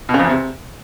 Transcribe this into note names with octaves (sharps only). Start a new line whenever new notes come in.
B2
C#3
F2
E2
C3